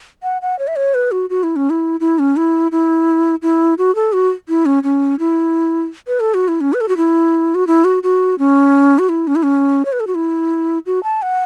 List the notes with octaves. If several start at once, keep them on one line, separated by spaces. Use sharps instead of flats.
F#5
F#5
C#5
E5
C#5
B4
F#4
F#4
E4
C#4
E4
E4
C#4
E4
E4
E4
F#4
A4
F#4
E4
C#4
C#4
E4
B4
A4
F#4
E4
C#4
B4
A4
F#4
E4
F#4
E4
F#4
F#4
C#4
F#4
E4
C#4
E4
C#4
C#5
B4
A4
F#4
E4
F#4
A5
F#5